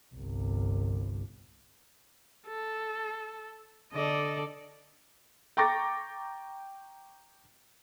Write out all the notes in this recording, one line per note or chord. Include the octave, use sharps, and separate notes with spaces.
G1 C2
A4
D3 A4 D5 D#5
G5 A#5 C#6 D6 A6 A#6